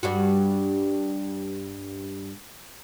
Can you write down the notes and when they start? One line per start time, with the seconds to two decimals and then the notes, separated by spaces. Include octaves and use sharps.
0.03 G2 G3 F#4